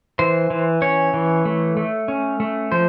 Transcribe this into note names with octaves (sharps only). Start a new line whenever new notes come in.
E3 C5
E3
C#4 C#5
E3
A3
A3
C#4
A3
F3 C5